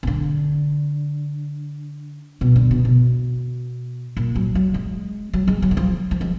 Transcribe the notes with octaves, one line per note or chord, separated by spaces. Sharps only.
B2
D3
B2
D3
B2
B2
A#2
F#3
F#3
G#3
F#3
G#3
F#3
D#3
F3
F3
G#3